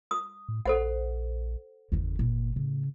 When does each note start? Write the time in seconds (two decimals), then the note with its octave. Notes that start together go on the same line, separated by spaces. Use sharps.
0.11 D#6
0.49 A2
0.66 A#1 A4 C5 F#5
1.92 G1 E2 C#3
2.19 A#2
2.56 A2 C#3